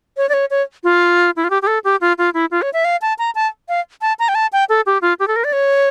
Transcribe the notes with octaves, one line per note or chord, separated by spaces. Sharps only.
C#5
D5
C#5
C#5
F4
E4
F4
G4
G4
A4
G4
F4
F4
E4
F4
C#5
E5
F5
A5
A#5
A5
F5
A5
A#5
G5
A5
G5
A4
G4
F4
G4
A4
A#4
D5
C#5